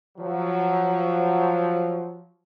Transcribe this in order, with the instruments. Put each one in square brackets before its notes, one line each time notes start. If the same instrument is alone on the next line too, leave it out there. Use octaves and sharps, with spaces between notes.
[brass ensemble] F3 F#3